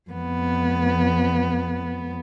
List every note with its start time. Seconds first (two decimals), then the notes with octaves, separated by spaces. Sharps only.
0.10 F2 B3